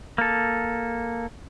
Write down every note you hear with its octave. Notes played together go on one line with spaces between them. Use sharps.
A#3 A4